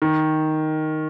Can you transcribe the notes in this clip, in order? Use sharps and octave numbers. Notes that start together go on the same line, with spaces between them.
D#3